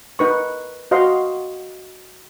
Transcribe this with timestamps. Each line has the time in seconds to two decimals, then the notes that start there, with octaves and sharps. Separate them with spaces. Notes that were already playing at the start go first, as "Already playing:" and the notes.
0.19 D#4 B4 C#6
0.91 F#4 C5 D#5 F5 F#5 C6